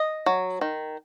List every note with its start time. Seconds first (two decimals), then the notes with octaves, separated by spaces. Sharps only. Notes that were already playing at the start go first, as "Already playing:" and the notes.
Already playing: D#5
0.26 F#3
0.61 D#3